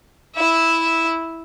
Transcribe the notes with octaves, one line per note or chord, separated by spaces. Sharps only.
E4 E5